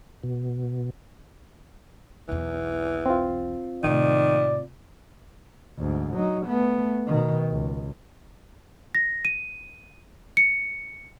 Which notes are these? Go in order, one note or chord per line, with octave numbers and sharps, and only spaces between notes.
B2
B1 E2 E3
C4 F4
A2 C3 D#3 D5
D2 G#2
F#3 D#4
A3 B3
B2 D#3
C#2
A#6
D#7
C#7